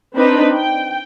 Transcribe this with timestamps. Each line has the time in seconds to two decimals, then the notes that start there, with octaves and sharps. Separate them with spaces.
0.15 C4 D4 D#4 B4
0.54 G5